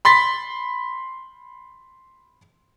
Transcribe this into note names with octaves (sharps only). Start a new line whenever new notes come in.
B5 C6 A6 B6